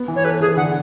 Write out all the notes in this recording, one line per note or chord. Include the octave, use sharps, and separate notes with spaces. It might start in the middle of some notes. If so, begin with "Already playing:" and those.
Already playing: B3
E3
C#5
A4 B4
E3 G#4
D3 F#5